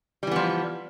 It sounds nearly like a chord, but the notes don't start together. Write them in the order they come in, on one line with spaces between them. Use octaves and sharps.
G3 E3 B3 F3